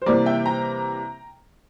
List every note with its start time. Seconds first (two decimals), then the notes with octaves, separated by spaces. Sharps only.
0.02 C5
0.06 C3 E3 G3 A#3 D5
0.26 E5 G5
0.46 G5 A#5